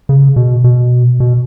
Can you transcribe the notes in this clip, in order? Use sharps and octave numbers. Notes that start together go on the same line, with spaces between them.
C#3
B2
B2
B2